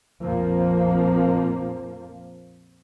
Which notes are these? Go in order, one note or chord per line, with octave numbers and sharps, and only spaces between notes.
A#1 F2 F3 A#3